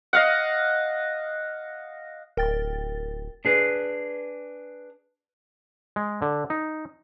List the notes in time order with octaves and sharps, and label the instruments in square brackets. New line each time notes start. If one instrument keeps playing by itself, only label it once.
[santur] D#5 F5 F#5
[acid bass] D1 [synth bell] A#4 G5 A6
[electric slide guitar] D4 G#4 B4
[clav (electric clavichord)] G#3
D3
D#4